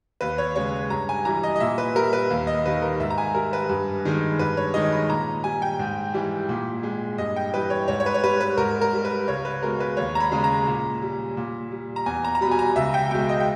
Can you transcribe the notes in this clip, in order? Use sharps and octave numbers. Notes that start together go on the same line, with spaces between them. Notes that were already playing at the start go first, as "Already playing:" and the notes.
D#2 B4
C#5
C#3 G#3 C#5
G2 A#5
G#5
E3 G3 A#5
D#5
D#5
A#2 E5
B4
G3 A#4
B4
D#2
D#5
D#3 G3 B4
A#4
G#2 E5
A#5
G#5
G3 A#4
B4
G2
D#3 G#3
G2 B4
C#5
D#3 G#3 D#5
B5
A#2 A#5
G3 G#5
G5
G#2
E3 G3
A#2
G#3
G2 D#5
G5
E3 G3 B4
C#5
G#2 C#5
C#5
B4
C#5
G3 B4
B4
G#2 A#4
A#4
G3
B4
C#2 C#5
B4
B2 G#3 A#4
B4
D#2 C#5
A#5
B5
C#3 G#3
A#5
A#2
G3
A#2
G3
A#5
E2 G#5
A#5
A#5
B2 G3 B5
G#5
A#5
C#2 E5
G5
B2 G#3 G5
D#5
G5